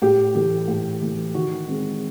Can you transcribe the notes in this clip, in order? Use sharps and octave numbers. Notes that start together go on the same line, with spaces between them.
A2 G4
E3 A3 G4
A2
E3 A3
D#3 F#4
G#3 C4